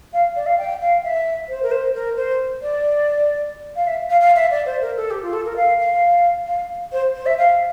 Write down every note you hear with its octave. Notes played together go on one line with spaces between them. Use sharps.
F5
D5
F5
G5
F5
E5
C5
A#4
C5
A#4
C5
D5
F5
E5
F5
F5
E5
D5
C5
A#4
A4
G4
F4
A4
A#4
F5
F5
F5
C5
C5
E5
F5